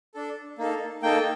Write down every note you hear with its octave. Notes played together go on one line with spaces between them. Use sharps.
D4 A4
A#3 D#4 A4
A#3 D#4 A4 G5